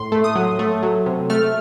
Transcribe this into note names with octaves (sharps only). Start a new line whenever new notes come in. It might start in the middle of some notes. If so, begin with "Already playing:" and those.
Already playing: A2 C6
A3
D#6
F#3
A3
F#3
C3
A3 F6